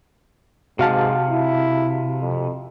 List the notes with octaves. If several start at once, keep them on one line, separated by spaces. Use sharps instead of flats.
G#2 C3 F#4 F5 A5
E4
F2